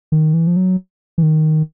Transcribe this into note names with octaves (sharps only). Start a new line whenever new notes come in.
D#3
E3
F3
F#3
E3
D#3